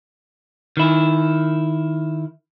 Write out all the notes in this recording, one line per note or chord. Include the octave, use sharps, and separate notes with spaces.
D#3 E4